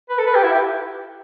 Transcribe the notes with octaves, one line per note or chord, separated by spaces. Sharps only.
B4
A4
B4
G4
E4
G4